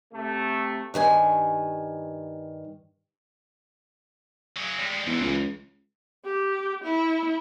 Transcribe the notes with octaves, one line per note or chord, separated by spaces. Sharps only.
C3 A3
G2 D#3 A4 G#5
F#3 G#4
G3 G#3
E2 G#2 E3
C#2
G4
E4